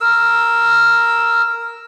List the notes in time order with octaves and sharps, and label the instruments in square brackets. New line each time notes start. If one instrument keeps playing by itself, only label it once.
[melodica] A#4 E6